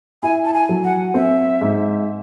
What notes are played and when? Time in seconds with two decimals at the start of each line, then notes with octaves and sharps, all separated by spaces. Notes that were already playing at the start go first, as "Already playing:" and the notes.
0.23 E4 G#5
0.45 A5
0.54 G#5
0.69 F#3
0.84 F#5
1.14 C4 E5
1.61 G#2